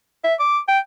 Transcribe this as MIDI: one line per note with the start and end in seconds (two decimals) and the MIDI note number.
0.24 0.34 76
0.40 0.59 86
0.68 0.79 79